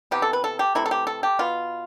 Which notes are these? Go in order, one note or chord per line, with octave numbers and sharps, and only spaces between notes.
C3 E3 B3 G4
A4
B4
A4
G4
C3 E3 A3 E4
A4
G4
A4
G4
B2 B3 F4